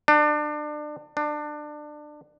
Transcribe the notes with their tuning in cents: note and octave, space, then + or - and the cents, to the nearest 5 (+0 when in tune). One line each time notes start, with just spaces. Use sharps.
D4 +30
D4 +25